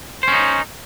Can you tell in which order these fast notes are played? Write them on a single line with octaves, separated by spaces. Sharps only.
C5 C#4 D#4